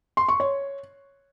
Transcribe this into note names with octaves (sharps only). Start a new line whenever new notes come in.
C6
C#6
C#5